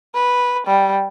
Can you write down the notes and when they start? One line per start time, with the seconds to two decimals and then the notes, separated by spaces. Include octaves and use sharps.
0.14 B4
0.67 G3